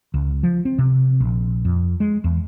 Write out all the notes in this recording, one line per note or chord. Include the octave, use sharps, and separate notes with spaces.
C#2
F3
C4
C3
A#1
F2
G#3
E2